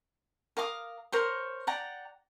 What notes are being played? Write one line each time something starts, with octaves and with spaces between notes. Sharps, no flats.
A#4 F5 D6 D#6
A#4 C5 C#5
D5 F#5 G5 A#5